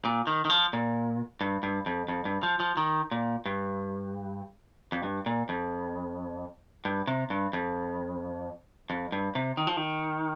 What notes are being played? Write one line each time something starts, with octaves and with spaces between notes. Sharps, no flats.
A#2
D#3
D#3
F3
A#2
G2
G2
F2
F2
G2
F3
F3
D#3
A#2
G2
F2
G2
A#2
F2
G2
C3
G2
F2
F2
G2
C3
D#3
F3
D#3